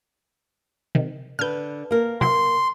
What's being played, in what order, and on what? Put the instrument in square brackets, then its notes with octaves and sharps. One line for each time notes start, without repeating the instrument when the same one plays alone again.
[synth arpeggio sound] C3 D#3
[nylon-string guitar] D3 B4 [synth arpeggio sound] F6 G6
[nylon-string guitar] A#3 A#4
[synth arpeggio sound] C3 F#3 E4 [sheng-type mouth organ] C6